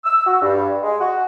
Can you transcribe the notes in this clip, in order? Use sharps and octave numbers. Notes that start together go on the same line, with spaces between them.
E6
F#4
G2
G#3
F#4